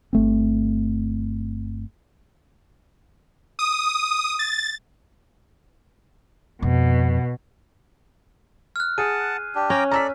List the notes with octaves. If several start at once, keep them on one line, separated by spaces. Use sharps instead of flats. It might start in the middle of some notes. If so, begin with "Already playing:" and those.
G1 A3 C4
D#6
A6
F2 B2
F6 F#6
G#4 F#5 A5 D#7
D4 G4
C#4 G5 A#5 D6
A4 D5 A#5 E6 B6